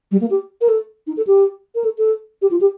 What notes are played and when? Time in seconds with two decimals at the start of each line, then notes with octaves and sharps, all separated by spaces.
0.12 G3
0.21 A#3
0.30 G4
0.61 A#4
0.69 A4
1.07 D#4
1.17 A4
1.27 G4
1.75 A#4
1.84 A4
1.98 A4
2.42 G4
2.51 F4
2.61 G4